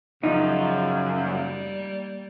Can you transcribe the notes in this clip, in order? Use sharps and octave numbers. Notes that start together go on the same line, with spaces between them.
F#2 C#3 F3 D#4
G3 A#3